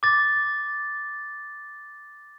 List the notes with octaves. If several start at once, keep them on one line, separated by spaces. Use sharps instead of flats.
D6 A6